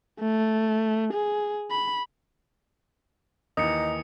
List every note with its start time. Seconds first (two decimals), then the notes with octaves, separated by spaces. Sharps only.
0.20 A3
1.13 G#4
1.71 B5
3.57 D#2 E3 D#4 D#6 C#7